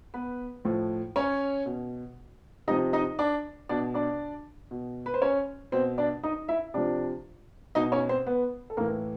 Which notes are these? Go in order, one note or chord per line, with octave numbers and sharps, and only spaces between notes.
B3 B4
A2 F3
C#4 C#5
B2
C3 F3 D#4 D#5
D#4 D#5
D4 D5
B2 D4 D5
D4 D5
B2
B4
C5
C#4 C#5
B2 C4 C5
D4 D5
D#4 D#5
E4 E5
C3 F3 D4 D5
B2 D#4 D#5
C#4 C#5
C4 C5
B3 B4
A4
A2 E3 A#3 A#4